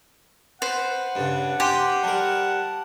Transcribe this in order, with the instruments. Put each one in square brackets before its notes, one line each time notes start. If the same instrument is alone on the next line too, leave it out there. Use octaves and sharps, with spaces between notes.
[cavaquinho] B4 C5 [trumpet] F#5
[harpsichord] G2 C#3 [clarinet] D4
[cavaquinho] G4 C5 [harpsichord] G#5 C6
[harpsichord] G3 A#4 [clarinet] A5